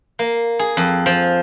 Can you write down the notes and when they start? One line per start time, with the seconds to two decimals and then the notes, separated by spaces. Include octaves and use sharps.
0.19 A#3
0.59 G#4
0.77 F2
1.06 F3